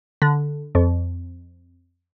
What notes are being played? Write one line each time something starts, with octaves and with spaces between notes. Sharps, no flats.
D3
F2